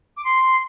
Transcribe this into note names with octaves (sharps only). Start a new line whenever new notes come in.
D6
C6